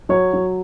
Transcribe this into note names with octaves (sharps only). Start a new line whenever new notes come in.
F#3 C#5
F#3